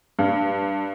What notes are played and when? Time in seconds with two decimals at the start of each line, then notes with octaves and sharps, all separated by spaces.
0.19 G2